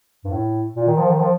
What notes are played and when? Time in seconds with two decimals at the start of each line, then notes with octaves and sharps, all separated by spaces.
0.25 G2
0.32 A2
0.76 A#2
0.87 D#3
0.99 F3
1.10 D#3
1.21 F3